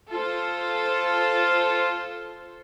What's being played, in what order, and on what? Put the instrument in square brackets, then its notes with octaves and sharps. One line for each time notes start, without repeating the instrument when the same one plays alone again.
[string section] F4 A4 C5